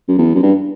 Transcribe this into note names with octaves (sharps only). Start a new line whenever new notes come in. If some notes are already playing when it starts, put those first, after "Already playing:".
F#2
E2
F#2
G2